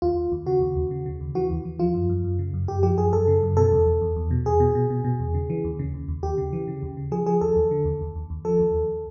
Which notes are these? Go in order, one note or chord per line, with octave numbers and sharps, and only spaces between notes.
D#2 F4
D#2
D#2
C#3 F#4
D#2
D#2
C#3
C#3
D#2
E3 F#4
D#2
E3
F3 F4
F#2
F#2
F#2
C#3
F#2
F#2 G4
F3 G4
F#2 G#4
F#2 A4
C#3
F#2
B2 A4
E2
E2
E2
E2
B2
E2 G#4
B2
B2
B2
B2
E2
C#3
E3
D#2
C#3
D#2
D#2
D#2 G4
C#3
E3
C#3
D#2
C#3
F3 G#4
F3 G#4
D#2 A4
D#2
D3
D#2
D#2
D#2
D#2
F3 A4
D#2
D#2